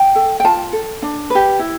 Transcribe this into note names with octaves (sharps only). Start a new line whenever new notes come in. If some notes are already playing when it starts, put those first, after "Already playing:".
Already playing: G5
A4
G5
F4 A5
A4
D4
G4 B4
E4